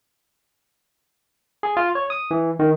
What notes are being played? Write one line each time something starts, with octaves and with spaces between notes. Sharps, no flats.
G#4
F4
C#5
D#6
E3
D#3